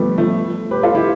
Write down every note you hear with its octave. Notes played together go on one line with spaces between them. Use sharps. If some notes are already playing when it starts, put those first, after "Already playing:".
Already playing: F3 G3 A3 B3
F3 A3
G4 B4
F4 A4
E4 G4